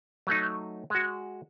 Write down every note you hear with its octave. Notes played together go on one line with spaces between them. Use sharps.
F#3 A3 D#4
G#3 F#4